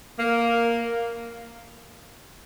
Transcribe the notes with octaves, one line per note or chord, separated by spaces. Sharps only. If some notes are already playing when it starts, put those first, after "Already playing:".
A#3